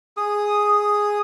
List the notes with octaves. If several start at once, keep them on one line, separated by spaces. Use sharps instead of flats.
G#4 D#6